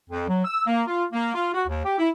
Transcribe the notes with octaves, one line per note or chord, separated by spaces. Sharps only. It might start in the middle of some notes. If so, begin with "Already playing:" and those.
F2
F#3
E6
A#3
F4
A#3
F4
F#4
D#2
G4
E4